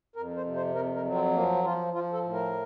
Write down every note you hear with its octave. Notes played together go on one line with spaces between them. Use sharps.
F2 A#4
C5
C3
C5
F2 A#4
A#4
F#3
C4
F3 A#3
F3 F4
F3 F4
A4
A2
A#4